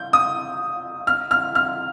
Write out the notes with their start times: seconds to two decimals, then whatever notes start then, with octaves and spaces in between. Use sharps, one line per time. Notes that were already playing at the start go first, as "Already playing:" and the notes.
Already playing: G6
0.13 D#6
1.07 F6
1.31 F6
1.55 F6